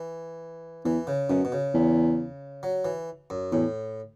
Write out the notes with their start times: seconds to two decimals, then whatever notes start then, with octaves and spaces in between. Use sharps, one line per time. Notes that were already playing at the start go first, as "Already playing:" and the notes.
Already playing: E3
0.85 E2 E3
1.07 C#3
1.30 F#2 B2
1.45 B2
1.52 C#3
1.74 E2
2.63 F#3
2.85 E3
3.30 F#2
3.52 E2 A2